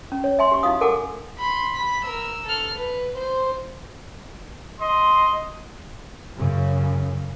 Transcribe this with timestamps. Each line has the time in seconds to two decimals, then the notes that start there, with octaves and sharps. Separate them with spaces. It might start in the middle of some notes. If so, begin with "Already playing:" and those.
0.12 C#4
0.24 C#5
0.39 E5 G#5 C6
0.52 G4 C#6
0.63 D#4 E4 F#4 F5 D#6
0.81 A4 A#4 F#5 G#5 D6
1.38 B5 C6
1.75 B5 B6
2.05 A#4 E6
2.45 A4 F6
2.75 B4
3.16 C5
4.80 D#5 C6
6.37 F#2 C#3